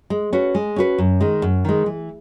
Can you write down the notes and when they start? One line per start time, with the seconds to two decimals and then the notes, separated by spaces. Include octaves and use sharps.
0.10 G#3
0.33 C#4 F#4 B4
0.55 G#3
0.76 C#4 F#4 B4
0.98 F#2
1.20 D#3 G#3
1.42 F#2
1.65 D#3 G#3
1.86 E3